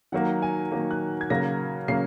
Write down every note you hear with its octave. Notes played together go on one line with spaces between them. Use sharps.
D#3 F#3 A#3 F#5
G#5
D#3 F#3 A#3
F#6
G#6
C#3 F#3 A#3 A#6
C#3 F#3 A#3 C7